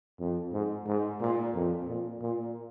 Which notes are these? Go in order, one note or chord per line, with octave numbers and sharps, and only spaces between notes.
F2
G#2
G#2
A#2
F2
A#2
A#2